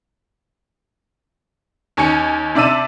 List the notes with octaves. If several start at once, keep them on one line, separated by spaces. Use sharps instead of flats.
D#2 C#4 G#5 C#7
C3 D4 D5 E5 E6 D#7